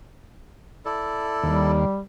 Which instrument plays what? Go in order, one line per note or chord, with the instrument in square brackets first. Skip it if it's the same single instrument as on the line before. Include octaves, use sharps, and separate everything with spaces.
[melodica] E4 A4 D5
[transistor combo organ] D#2 [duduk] G3